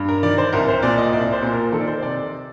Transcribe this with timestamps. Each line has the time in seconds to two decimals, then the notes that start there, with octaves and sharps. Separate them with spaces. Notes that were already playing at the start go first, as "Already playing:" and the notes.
Already playing: G2
0.09 A#4
0.23 D#3 D5
0.38 C5
0.53 C2 A#4
0.68 C5
0.83 A#2 D5
0.98 D#5
1.13 C2 D5
1.32 C5
1.43 A#2
1.53 A#4
1.72 D#3 A4
1.80 D5
1.87 C5
1.98 C5
2.02 C3 D5